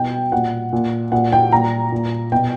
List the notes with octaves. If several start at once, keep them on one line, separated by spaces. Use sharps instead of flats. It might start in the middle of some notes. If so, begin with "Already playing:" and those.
Already playing: B2 G5
A#2 F#5
A#2
A#2 F#5
G5
A#2 A#5
A#2
B2 G5